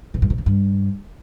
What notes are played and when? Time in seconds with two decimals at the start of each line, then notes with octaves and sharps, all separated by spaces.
0.14 B2
0.22 G2
0.30 C3
0.38 C#3
0.46 G2